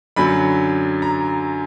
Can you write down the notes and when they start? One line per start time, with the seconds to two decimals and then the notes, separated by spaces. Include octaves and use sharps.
0.16 F#2 D3 F#3 B5
1.02 A#5